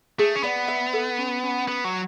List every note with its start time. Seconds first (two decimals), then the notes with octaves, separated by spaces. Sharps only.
0.19 A3 G#4
0.36 C#4
0.43 B3 D5
0.68 E5
0.93 A4
1.18 C#4
1.43 C#4
1.68 B3 B4
1.84 F#3